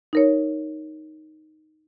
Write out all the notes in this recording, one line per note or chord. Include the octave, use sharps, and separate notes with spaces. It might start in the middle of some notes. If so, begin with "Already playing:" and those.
D#4 A#4 C#5